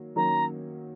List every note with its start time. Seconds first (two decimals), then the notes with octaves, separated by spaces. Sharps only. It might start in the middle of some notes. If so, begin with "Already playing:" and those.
Already playing: D#3 F#3 A#3
0.16 D#3 F#3 A#3 C#4 A#5